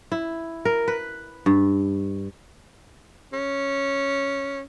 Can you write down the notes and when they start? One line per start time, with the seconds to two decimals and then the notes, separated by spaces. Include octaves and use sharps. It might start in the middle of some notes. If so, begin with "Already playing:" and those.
0.12 E4
0.65 A#4
0.88 B4
1.46 G2
3.33 C#4